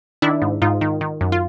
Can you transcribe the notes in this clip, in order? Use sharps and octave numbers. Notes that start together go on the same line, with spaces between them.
D#3 D4 E4
G#2
G#2 D#4 F4
D#3
D#3
F#2
F4